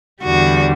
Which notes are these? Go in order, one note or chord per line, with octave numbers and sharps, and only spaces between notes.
E2 D3 G3 F#4